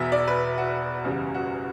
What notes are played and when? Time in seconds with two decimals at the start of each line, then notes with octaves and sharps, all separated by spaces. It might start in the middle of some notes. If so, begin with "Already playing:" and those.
Already playing: E1 E2 B2 E5
0.12 D5
0.27 B4
0.58 F#4
1.04 F#1 E2 C#3 G3
1.34 F#4